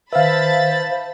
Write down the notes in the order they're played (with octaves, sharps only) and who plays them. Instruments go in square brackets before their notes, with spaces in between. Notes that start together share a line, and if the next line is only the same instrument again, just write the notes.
[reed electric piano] D#3 B4 [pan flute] C5 [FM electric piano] E5 F5 [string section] A5 B5 A6